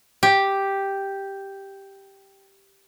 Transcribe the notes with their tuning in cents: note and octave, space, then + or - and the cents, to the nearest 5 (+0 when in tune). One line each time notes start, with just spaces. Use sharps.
G4 +0